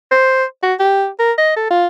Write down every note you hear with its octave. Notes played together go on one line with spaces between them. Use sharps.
C5
F#4
G4
A#4
D#5
A4
F4